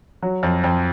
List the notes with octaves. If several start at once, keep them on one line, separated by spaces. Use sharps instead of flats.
F#3
F2
F2